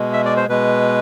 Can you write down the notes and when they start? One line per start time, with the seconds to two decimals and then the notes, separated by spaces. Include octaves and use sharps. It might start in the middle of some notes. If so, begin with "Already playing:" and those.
Already playing: B2 G#3
0.13 E5
0.25 D5
0.37 C5
0.49 B2 G#3 B4